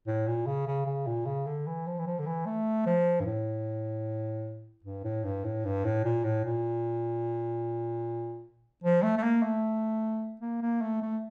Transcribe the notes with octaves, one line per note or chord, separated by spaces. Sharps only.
A2
A#2
C#3
C#3
C#3
A#2
C#3
D3
E3
F3
E3
F3
D3
E3
A3
F3
G2
A2
G2
A2
G2
A2
G2
A2
A#2
A2
A#2
F3
A3
A3
A#3
A3
A#3
A#3
A3
A3